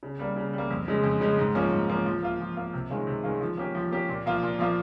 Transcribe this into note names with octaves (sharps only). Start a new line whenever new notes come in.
C#3
G3 A#3
C#3
G3 A#3
F2
C#3 G#3
F2
C#3 G#3
G#2
F3 A#3 C#4
G#2
F3 A#3 C#4
F3
A#3 F4
F3
A#3 F4
C3
D#3 G#3 C#4 F4
C3
D#3 G#3 C#4 F4
F3
A#3 C#4 G4
F3
A#3 C#4 G4
A#2
F3 A#3 F4
A#2
F3 A#3 F4